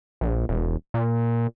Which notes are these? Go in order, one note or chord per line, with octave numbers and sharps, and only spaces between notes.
A#1
E1
A#2